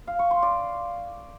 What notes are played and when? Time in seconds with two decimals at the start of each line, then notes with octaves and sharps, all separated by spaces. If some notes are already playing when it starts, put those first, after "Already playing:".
0.07 F5
0.19 C#6
0.31 C6
0.42 D5